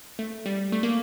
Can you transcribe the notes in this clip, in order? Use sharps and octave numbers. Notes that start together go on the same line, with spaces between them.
A3
G3
A3
A#3